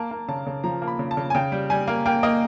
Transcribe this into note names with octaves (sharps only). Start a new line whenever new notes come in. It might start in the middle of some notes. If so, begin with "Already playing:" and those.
Already playing: A#3 A5
A#3
C#3 A5
C#3
F3 A#5
A#3
B5
C#3
A5
C#3
G#5
C#3 G5
G3
G3 G#5
A#3
A#3 G5
A#3 D#5